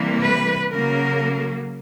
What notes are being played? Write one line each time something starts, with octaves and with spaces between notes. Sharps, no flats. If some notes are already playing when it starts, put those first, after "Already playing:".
Already playing: C3 E3 G3 A#3
B4
C#3 F#3 A#3 A#4